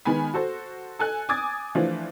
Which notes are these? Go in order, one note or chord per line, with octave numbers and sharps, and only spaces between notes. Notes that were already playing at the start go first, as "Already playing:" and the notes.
D#3 G#3 B3 G#5 B5
F#4 A4 C5
A4 G#5 F#6
G#5 D6 D#6 G#6 A6
E3 F3 A3 D4 F4